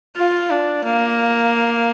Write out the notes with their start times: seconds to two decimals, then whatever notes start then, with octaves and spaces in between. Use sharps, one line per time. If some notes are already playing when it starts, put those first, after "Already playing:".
0.16 F4
0.50 D4
0.84 A#3